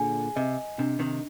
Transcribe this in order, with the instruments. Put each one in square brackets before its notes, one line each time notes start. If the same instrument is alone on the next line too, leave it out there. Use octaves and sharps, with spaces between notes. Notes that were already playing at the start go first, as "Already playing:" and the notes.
Already playing: [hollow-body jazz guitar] A#2 D3 [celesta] G#4 G#5
[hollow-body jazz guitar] C3 [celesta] D#5
[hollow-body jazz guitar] C3 [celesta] D4
[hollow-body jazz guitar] C3 D#3